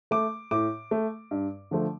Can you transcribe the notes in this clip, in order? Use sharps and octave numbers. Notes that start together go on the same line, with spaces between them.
A3 D6
A2 D6
A3
G2
D3 F3 A3